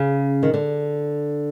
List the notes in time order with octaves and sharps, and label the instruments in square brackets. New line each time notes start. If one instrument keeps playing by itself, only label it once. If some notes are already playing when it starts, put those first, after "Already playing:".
Already playing: [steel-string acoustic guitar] C#3
D#3
D3